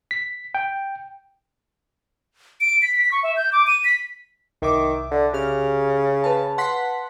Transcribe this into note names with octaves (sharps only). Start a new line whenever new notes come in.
B6
G5
D7
B6
B6
C#6
E5
G6
D6
D#7
B6
C2 D#3 E5 D6
D3
C#3 G4 F6
B4 F5 A5
F#5 C6 B6